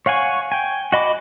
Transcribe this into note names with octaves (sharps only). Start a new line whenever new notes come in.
C#5 F5 F#5 G#5 C#6
G5 G#5
F#4 D#5 B5 D6